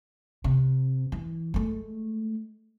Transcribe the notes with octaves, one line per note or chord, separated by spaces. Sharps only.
C3
E3
G#3 A3